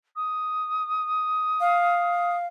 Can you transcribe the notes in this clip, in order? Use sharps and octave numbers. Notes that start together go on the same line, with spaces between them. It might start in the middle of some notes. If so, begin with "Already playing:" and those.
D#6
F5